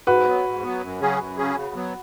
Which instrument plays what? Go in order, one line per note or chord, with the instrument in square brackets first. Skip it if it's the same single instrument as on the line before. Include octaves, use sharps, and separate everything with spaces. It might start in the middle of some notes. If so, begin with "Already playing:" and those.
[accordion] G#2 [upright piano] F#4 B4
[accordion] F#3 B3
G#2
F#3 B3
F#2
C#3 F#3 C#4 G#4
F#2
C#3 F#3 C#4 G#4
C#3
F#3 B3